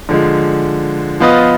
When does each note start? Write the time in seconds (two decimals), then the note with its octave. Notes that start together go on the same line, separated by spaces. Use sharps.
0.09 D3 F3 G#3
1.20 F3 B3 F4 B4 D#5